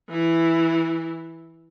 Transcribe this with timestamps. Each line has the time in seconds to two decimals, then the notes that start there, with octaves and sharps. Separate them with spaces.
0.10 E3 E4